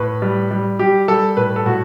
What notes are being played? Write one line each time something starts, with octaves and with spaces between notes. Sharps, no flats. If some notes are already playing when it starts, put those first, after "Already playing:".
Already playing: A2 B4
G3
G3
G3 G4
G3 A4
A2 B4
A4
A2 F#4